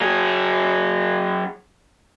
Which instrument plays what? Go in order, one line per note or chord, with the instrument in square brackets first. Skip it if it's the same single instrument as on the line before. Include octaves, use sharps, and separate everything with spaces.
[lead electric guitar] F#3 G#4